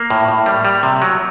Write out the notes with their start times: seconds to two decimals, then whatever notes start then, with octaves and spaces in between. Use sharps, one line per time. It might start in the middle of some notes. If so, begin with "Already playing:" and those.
Already playing: A#3
0.10 A2
0.28 A2
0.46 G3
0.65 G3
0.83 C3
1.02 F#3